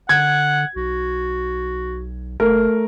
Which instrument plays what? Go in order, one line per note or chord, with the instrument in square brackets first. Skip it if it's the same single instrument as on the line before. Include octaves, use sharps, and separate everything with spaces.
[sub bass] D3 [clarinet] F#5 [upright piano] G#6
[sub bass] B1 [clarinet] F#4
[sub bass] F#1 [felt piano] A3 [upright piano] A#4